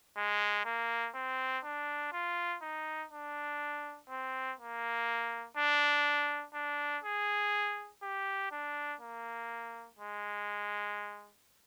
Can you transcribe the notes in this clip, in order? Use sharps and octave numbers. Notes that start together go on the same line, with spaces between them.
G#3
A#3
C4
D4
F4
D#4
D4
C4
A#3
D4
D4
G#4
G4
D4
A#3
G#3